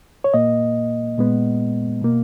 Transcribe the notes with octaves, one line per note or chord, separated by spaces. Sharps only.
C#5
A#2 A#3 D#5
A#2 G#3 B3
B2 A#3